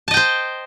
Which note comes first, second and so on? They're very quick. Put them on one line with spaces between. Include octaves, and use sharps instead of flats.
A5 D#5 G5 C5